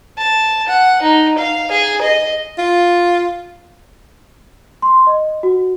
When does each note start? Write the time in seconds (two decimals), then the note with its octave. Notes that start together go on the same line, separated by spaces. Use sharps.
0.18 A5
0.68 F#5
1.02 D#4
1.38 F5
1.71 G#4
2.02 D#5
2.58 F4
4.82 C6
5.07 D#5
5.43 F#4